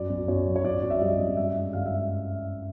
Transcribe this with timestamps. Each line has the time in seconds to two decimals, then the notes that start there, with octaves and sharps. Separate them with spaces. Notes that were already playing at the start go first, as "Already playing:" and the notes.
Already playing: F#2 D5
0.10 F#2
0.28 F#2 C#5
0.47 F#3
0.56 C#5
0.65 F#2 D5
0.83 F#2
0.90 E5
1.01 G3 D#5
1.19 F#2
1.37 G2 E5
1.56 G#3
1.73 G2 F5
1.86 E5